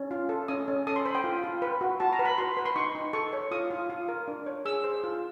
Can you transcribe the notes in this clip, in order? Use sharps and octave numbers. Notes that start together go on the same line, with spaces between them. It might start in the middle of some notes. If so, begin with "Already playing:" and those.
Already playing: C#4
F4
A4
C#4 D#6
C#4
A4 D#6
C6
C5 B5
G5
F4
F4
B4
F#4
F#4 A5
A#5
B4
B5
F#4 C6
B4
C6
D#4 C#6
D#4
A4 C#6
C#5
F4 D#6
F4
F4
A#4
D4
C#5
G#4 E6
C5
F4